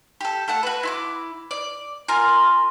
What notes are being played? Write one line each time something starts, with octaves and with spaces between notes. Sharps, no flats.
G4 A4
A3 A4 F#5
F#4 B4
E4 C6 D6
D5
F4 A#4 G#5